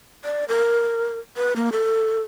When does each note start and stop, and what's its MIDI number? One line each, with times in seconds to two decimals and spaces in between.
0.24 0.45 74
0.49 1.19 70
1.37 1.53 71
1.56 1.70 58
1.72 2.22 69